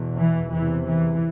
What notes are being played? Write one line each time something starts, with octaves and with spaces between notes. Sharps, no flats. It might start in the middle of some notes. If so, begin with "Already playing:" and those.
Already playing: E2 B2
E3
E2 C3 E3
E3